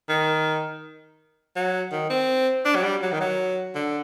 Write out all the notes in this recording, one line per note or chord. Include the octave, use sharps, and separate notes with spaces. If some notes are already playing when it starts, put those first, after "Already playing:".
D#3
F#3
D#3
C4
D4
F#3
G3
F#3
D#3
F#3
D3